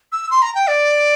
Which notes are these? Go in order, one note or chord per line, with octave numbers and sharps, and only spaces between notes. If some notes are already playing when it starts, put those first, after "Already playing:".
E6
C6
A#5
G5
D5